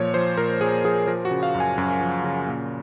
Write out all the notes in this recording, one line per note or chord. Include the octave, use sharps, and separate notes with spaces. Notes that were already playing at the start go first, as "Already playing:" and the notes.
Already playing: A#2 F3 C#5
F3 C5
A#2 A#4
A#2 G#4
F3 G#4
F3 A#4
F#4
C#3
F5
F#2
G#5
F#2
F3
C#3
A#2